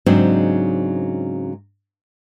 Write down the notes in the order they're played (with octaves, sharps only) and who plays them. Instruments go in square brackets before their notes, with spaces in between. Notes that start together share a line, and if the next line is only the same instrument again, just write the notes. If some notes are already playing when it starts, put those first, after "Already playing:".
[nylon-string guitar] G#2 C#3 F#3 C4 D4 D#4